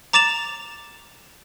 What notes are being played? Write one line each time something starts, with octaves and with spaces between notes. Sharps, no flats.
A#5 D6 A6 E7 F7